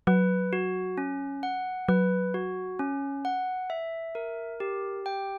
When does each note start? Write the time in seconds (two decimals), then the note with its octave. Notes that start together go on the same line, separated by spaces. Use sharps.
0.07 F#3 B4
0.53 F#4
0.98 C#4
1.43 F#5
1.89 F#3 B4
2.34 F#4
2.79 C#4
3.25 F#5
3.70 E5
4.15 A#4
4.60 G4
5.06 G5